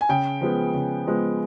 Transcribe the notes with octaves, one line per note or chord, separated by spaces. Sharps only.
G#5
C#3 G5
F3 G#3 B3
C#3
F3 G#3 B3